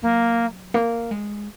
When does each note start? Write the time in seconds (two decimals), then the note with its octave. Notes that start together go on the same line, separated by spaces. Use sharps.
0.02 F#3 A#3
0.74 A#3
1.11 G#3